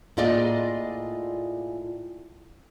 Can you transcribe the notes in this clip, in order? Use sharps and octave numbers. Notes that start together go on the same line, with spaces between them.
A2 A#3 F4 G#4 D5 D#5